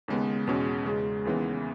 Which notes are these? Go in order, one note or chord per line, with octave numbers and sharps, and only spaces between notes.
D#2 C#3 G#3 B3
E2 B2 G#3 C#4
E2 C#3 G#3
D#2 C#3 E3 B3